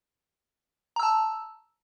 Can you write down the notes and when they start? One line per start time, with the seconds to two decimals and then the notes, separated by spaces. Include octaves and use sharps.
0.96 A#5
1.00 E6
1.03 A5